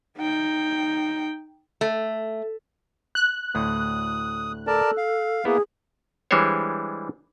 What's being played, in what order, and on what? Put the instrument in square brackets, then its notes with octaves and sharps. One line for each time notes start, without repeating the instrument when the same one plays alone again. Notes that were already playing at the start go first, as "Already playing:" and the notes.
[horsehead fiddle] D#4 G5
[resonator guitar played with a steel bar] A3
[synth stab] F#6
[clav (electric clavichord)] D2 A2 [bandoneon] D#6
[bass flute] A4 [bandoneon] A#4 D5 A5
[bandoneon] F5
[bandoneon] A#3 [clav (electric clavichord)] B3 E4 [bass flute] G#4
[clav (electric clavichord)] E3 G3 G#3 D4 C5 C#5